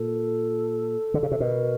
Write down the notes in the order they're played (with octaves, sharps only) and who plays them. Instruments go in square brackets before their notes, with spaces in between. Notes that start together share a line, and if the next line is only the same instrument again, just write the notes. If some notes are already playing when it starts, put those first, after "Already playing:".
Already playing: [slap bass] A#2 [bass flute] A4
[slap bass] D3
C#3
C3
[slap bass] B2 [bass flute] A#4